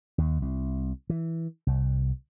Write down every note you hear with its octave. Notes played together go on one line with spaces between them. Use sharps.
D#2
C2
E3
C2